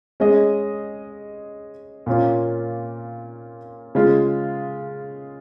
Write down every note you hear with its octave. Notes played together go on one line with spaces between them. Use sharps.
G#3 C#4 G#4 D#5
A#2 A#3 C#4 F4
C#3 G#3 F4